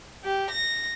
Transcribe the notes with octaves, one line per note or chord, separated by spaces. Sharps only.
G4
A#6